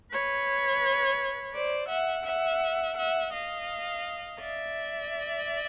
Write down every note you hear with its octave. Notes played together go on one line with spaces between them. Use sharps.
B4 C#5
C5 D5
E5 F#5
E5 F#5
E5 F#5
D#5 F5
D5 E5